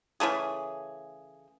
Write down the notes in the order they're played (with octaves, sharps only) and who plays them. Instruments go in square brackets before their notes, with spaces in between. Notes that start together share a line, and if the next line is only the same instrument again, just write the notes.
[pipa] C#3 E3 A3 G#4